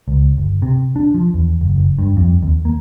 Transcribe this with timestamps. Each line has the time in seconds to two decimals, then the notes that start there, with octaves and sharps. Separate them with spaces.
0.08 C#2
0.38 G1
0.62 C3
0.96 D4
1.14 F3
1.34 E2
1.61 F#1
1.76 F#1
1.98 G2
2.17 F2
2.43 D#2
2.65 A#3